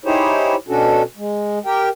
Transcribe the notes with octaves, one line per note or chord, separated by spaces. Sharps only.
D#4 E4 G4 G#4 C5 C#5
B2 C#4 D4 F#4 A4
G#3
G4 A#4 G5